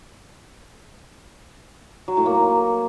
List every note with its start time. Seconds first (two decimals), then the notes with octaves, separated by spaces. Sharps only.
2.08 F#3
2.17 A2
2.26 A#3